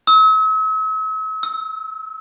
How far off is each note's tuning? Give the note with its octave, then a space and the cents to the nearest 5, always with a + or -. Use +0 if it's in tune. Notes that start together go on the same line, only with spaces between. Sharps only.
E6 -45
E6 -10